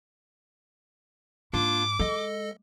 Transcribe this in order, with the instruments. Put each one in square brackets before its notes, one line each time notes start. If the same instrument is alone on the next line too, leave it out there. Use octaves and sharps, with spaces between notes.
[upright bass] G#2 [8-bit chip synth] A#3 D4 F4 [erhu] D6
[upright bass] G#3 [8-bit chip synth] A4 D#5